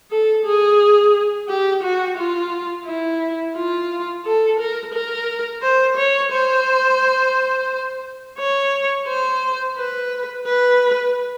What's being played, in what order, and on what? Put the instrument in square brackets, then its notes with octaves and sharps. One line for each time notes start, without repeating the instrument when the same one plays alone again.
[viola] A4
G#4
G4
F#4
F4
E4
F4
A4
A#4
A#4
C5
C#5
C5
C#5
C5
B4
B4